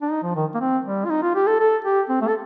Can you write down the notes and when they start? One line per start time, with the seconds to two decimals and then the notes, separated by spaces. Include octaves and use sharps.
0.02 D4
0.11 D#4
0.23 F3
0.36 D#3
0.55 A#3
0.60 C4
0.85 G3
1.05 F4
1.10 D#4
1.23 F4
1.35 G4
1.47 A4
1.60 A4
1.85 G4
2.09 C4
2.22 A3
2.28 A4